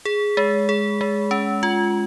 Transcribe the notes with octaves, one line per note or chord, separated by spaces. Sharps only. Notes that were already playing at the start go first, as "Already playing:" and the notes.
G#4
G#3
G#4
G#3
C#4
F4